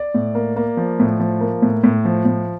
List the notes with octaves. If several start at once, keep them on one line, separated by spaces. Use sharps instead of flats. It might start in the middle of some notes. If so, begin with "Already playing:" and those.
Already playing: D5
A2
A#3
A#3
F3
A2
F3
A#3
A2
A2
F3
A2